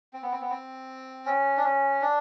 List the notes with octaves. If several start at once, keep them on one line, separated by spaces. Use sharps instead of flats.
C4
B3
C4
B3
C4
C#4
D4
C#4
D4